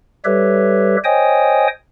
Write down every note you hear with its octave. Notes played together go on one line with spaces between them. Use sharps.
G3 G4 A4 B4 C#5 E5
C5 C#5 D#5 G5 G#5 D#6